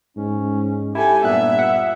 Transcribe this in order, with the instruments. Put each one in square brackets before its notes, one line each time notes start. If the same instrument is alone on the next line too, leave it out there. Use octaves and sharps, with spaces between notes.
[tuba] G#2 [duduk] C#4
[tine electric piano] E4 [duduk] G4 [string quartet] A4 G#5
[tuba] G2 [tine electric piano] A#2 F#6 [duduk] B3 [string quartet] E5
[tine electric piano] F#5